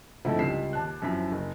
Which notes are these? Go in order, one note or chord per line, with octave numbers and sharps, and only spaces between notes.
G#2 D3 F3 A3 C4 E4
C#2 G3 B6 C7 E7
D#2 A5 F#6
F#2 F3 E4 B6
F#1